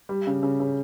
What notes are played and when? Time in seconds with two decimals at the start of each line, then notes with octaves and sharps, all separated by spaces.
0.09 G3
0.27 C#3
0.43 C#3
0.60 C#3